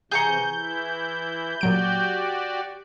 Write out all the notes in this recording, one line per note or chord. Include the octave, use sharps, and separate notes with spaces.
C3 E3 G#4 A#5 C#6 G6
E3 E4
A#2 F#3 F#4 G4 D5 D7